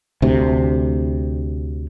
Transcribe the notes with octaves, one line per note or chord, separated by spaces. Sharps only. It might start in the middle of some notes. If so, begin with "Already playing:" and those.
D2 C3